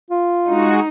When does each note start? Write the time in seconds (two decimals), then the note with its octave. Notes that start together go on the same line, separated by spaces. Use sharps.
0.10 F4
0.48 G#3 D#4 F#4